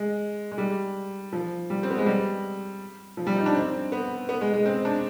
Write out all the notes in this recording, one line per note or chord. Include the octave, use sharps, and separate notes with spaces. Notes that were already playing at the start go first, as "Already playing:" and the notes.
Already playing: G#3
G#3
G3
F3
G3
C4
B3
G#3
G3
F3
G3
D#4
D4
C4
B3
B3
G#3
G#3
C4
D4